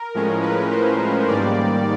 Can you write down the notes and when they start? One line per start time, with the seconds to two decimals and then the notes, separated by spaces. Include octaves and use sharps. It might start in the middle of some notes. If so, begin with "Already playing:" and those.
Already playing: A#4
0.15 A2 F3 G#3 C#4
0.43 B4
0.71 C5
1.27 G#2 D#3 G3 A#3 D5